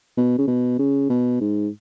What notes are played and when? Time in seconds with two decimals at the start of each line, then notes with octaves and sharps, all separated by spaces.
0.17 B2
0.38 C#3
0.47 B2
0.79 C#3
1.10 B2
1.41 G#2